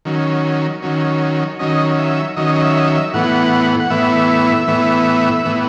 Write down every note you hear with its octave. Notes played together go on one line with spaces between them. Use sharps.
D#3 F#3 C#4
D#3 F#3 C#4
D#3 F#3 C#4 D#5
E5
D#3 F#3 C#4 D#5
D#5
E5
D#5
E5
A2 E3 B3 F#5
F#5
A2 E3 B3 E5
A2 E3 B3
A2 E3 B3